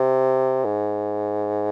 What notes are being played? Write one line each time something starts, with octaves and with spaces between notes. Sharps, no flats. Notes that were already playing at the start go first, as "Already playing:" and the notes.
Already playing: C3
G#2